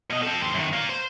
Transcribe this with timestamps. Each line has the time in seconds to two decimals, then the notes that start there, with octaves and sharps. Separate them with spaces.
0.10 B2 D#5
0.23 C4 A4
0.41 D#2 C5
0.54 F#2 D#3
0.73 A#3 F4
0.90 C5